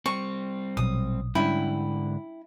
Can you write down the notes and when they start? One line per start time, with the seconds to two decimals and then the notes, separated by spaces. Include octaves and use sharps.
0.06 G3 C4 C#6
0.77 A#1 B2 F#3 D#6
1.35 G#2 D3 G3 C#4 D4 E4 G5